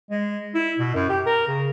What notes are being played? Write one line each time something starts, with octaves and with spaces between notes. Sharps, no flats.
G#3
E4
B2
F#2
G4
A#4
C#3